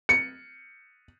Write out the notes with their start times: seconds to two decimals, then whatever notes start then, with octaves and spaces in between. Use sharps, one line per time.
0.09 C#7